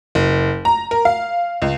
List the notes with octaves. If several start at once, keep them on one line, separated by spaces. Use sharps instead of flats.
F#1
A#5
A#4
F5
C#2